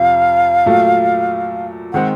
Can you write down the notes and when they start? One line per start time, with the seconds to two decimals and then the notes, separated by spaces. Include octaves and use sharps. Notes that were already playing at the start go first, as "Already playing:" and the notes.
Already playing: F2 C3 F3 F5
0.66 A#2 F#3 A3
1.92 D#3 G#3 C4 F#5